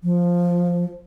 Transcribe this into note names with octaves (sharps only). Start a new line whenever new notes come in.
F3